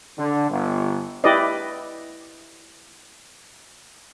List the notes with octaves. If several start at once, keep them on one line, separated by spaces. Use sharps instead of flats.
D3
G1
E4 G4 B4 D5 D#5